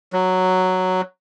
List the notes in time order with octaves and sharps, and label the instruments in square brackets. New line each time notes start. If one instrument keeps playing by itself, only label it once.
[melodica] F#3